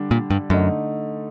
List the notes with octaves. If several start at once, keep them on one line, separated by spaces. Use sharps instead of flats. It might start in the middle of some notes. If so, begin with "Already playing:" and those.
Already playing: D3 G3 D4
A#2
G2
F#2 D3 A3 D#4